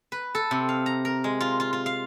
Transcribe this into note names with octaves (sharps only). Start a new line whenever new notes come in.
B4
A4
C3
F5
A#5
A#4
G#3
F4
F4
F4
F5